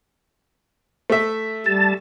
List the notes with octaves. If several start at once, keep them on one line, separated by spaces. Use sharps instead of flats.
A3 E5
G3 A5